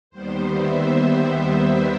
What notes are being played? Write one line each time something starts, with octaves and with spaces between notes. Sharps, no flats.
D#2 D#3 G3 B3 C5
E5
C5